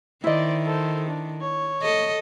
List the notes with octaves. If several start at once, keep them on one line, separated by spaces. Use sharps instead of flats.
D#3 E4 C5 D5 D#5
A4 C5
D4
C#5
A4 D#5